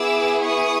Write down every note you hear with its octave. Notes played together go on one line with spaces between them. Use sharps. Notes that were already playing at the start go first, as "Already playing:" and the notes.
Already playing: B3 E4 G#4 D6 E6
C#6 D#6